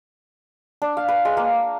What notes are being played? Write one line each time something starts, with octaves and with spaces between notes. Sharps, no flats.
D4
F5
B4
G#3
A#3